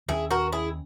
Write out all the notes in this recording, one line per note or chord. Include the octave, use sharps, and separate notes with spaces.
D#2 D#3 A#3 C#4 E4 G#4
F#4 A#4
E4 G#4